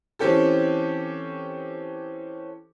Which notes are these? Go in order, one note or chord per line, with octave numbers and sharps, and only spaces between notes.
E3 C4 C#4 G4 A4